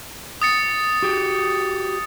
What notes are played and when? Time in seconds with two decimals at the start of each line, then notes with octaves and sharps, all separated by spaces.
0.42 D#6 A6 C#7
1.03 F#4 G4